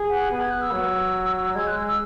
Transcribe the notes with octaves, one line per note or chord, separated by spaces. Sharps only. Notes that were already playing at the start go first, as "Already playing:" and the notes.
Already playing: G#4
F#5
B3 G#5
G#6
F#6
E6
F#3
G#3 G#6
F#6
E6
E6